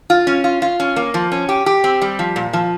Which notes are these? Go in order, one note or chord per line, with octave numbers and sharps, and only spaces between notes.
F4
C#4
F4
F4
C#4
A#3
F3
C#4
G4
G4
C4
G3
F3
A#2
F3